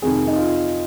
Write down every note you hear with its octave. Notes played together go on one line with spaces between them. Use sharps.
F2 C3 D#3 G#4
D#4
F4